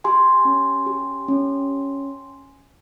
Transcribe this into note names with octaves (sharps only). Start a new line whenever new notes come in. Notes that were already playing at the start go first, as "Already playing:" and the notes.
G4 G#5 C6
C#4
G4
C#4